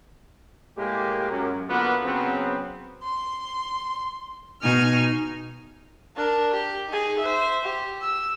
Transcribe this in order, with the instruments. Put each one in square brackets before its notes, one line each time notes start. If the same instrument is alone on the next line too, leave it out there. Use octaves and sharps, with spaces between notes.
[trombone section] A2 G#3 A#3 G4
F#2
D3 A#3 B3 F4 F#4 B4
C#3 F#3 B3 C4
[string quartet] C6
B2 D#4 G#5 F6
[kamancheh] D4 A#4
G4
D#4 G#4
C5 E5
G4
E6